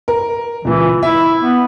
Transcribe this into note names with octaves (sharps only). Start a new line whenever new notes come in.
A#4
C#2 A#2 E3
E4 E5
B3